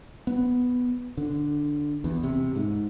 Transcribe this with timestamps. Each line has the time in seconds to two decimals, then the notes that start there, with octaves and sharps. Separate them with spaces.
0.27 B3
1.17 D3
2.04 E2
2.23 C3
2.56 G#2